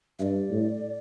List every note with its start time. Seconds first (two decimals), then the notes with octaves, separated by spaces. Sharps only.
0.19 G2 D5 E5
0.50 A2